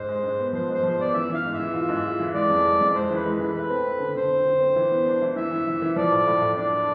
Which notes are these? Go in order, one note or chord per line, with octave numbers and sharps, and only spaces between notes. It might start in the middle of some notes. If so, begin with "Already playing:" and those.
Already playing: G#2 C5
G#3
G#2
B3
F3 C5
G#2 C5
F3
C5
B3 D5
E3 E5
E3 F5
G#2
E5
E3
F4
G#2
F4
E3
G#3 D5
F2
G#3
F2
G#3 C5
E3 B4
G#3
B4
E3
A3 B4
C4
A3
D3
D3 C5
C4
D3
C4
E3
B3
D4
E3
E3 E5
E3
E3
E3
F3 D5
A2
A2
A2
D4 D5
D4